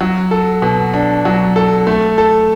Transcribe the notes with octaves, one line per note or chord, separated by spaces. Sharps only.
F#3
A4
B2
D4
F#3
A4
A3
A4